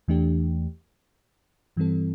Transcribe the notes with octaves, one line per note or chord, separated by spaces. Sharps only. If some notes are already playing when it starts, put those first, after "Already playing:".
E2 E3 A3 D4 G4
G2 E3 G3 C4 A4